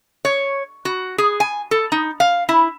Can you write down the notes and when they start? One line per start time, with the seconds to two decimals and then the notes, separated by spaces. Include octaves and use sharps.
0.25 C#5
0.85 F#4
1.18 G#4
1.40 G#5
1.71 A4
1.92 D#4
2.20 F5
2.49 E4